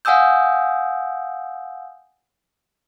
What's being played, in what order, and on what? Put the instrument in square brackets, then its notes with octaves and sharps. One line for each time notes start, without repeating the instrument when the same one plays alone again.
[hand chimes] F5 F#5 G#5 D#6 E6 G6